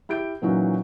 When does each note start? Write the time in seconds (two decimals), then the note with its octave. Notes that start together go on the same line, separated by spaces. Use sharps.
0.09 E4 G4 G6 D7
0.42 A#2 E3 F#3 C#4 D#4